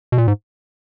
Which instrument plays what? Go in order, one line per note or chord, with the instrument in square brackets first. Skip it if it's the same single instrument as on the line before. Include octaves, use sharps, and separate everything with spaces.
[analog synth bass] B2
A#2
G#2